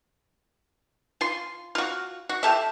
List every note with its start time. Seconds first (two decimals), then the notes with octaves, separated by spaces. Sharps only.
1.21 F4 C6
1.75 F4 F#4
2.29 F#4
2.43 F4 G4 A4 E5